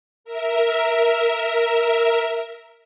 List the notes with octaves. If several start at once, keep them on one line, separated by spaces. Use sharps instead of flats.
A#4 E5